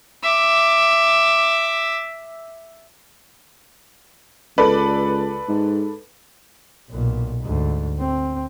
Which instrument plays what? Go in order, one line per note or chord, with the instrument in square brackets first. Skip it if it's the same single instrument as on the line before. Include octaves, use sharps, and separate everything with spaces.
[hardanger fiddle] E5 D6
[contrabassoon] C#2 [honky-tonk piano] A4 B4 D5
[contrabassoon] G#2
[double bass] B1 A#2
D2 G#2
C4